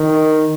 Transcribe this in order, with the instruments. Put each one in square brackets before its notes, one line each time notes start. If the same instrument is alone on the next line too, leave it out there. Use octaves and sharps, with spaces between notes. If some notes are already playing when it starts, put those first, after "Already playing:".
Already playing: [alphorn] D#3